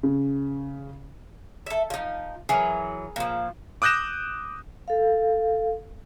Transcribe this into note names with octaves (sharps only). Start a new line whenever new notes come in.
C#3
A4 E5
F3 D#4
E3 F#3 G#4 A#4
A#2 F3
D6 D#6 F#6 G6 A#6 E7
A4 F5